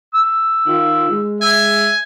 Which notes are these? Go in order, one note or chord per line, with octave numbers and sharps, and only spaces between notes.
E6
D#3 F4
G#3
E5 G#5